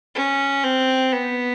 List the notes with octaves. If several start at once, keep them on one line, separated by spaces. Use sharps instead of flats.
C#4
C4
B3